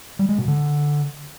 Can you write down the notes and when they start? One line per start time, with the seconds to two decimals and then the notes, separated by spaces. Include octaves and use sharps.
0.19 G3
0.29 G#3
0.38 B2
0.48 D3